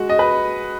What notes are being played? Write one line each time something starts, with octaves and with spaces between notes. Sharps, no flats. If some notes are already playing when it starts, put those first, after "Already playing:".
Already playing: G#3 F#4
D#5
B4